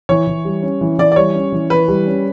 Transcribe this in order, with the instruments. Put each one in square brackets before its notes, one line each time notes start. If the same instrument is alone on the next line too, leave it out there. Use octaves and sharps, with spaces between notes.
[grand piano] E3 [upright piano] C#5
[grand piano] E3
G3
C#4
E3
[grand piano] E3 [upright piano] D5
[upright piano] D5
[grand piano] G3 [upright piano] C#5
[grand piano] C#4
E3
[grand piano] E3 [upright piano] B4
[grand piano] G3
C#4